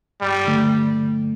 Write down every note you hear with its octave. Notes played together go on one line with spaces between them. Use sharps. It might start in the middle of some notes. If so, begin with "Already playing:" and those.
G2 G3
D3 A3